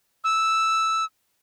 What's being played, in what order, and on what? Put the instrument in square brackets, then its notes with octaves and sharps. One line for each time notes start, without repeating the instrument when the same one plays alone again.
[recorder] E6